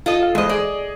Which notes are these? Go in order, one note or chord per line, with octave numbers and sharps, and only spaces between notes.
F4 A4 D#5
F5
E2 G#3 C5 D#5
G#4 D5 D#5